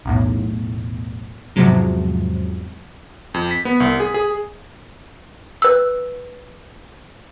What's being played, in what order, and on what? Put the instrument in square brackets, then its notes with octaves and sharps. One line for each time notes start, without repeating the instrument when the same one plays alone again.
[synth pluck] B1 E2 A2
E2 G#2 C3 F3 F#3 G#3
[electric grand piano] F2
B6
B3
C2
G#4
G#4
[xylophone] B4 E6